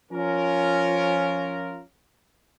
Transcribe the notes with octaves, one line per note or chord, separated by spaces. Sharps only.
F3 C#4 F4 A#4